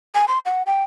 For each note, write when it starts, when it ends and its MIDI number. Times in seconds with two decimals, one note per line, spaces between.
0.15 0.25 80
0.28 0.39 84
0.45 0.63 78
0.66 0.84 79